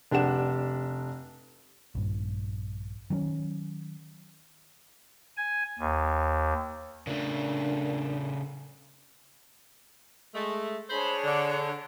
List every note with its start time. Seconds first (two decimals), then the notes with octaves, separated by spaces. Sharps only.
0.11 F1 D4 G4 F#5 E7
1.95 A#1 G2
3.10 D#3 F#3 B3 C#4
5.37 G#5
5.79 D#2
7.07 A#2 C#3 A3 D4
10.35 G#3 A3
10.89 D4 G#4 C5 C#5 B5
11.24 D3